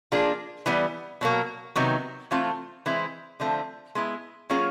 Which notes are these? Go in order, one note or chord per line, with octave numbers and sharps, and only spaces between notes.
F3 A#3 D4 F4 G#4
E3 G3 B3
B2 F#3 A#3
C3 D#3 F#3 B3 D#4
E3 A3 C4 F4
E3 G#3 C4 E4
D3 F3 A3 C4
G#3 B3 E4
F#3 A#3 C#4 F4 G#4